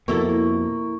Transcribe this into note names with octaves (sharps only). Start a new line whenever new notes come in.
F2 B2 A#3 E4 A4 C#6